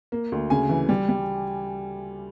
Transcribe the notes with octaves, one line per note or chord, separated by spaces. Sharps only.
A#3
D2
C#3 G#5
E3
G3
G3